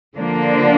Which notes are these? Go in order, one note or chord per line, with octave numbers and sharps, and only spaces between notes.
D3 F3 A#3 D4